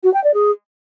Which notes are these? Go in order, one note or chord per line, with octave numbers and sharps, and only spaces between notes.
F#4
G5
D5
G#4